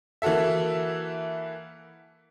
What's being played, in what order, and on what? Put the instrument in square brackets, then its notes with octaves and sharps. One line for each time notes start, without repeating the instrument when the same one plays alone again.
[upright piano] E3 A#3 F#4 A4 E5